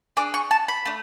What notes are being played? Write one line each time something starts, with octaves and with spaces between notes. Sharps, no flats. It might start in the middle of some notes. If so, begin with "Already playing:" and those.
D4 G#4 D6
C#6
A5
B5
A3 D4